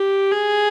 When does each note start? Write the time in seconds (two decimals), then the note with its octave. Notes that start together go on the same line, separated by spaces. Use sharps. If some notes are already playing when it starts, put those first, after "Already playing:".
Already playing: G4
0.31 G#4